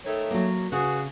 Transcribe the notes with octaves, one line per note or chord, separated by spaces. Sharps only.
D#3 A3 C#5
F#3 A#3
C#3 F#4 G#4 B4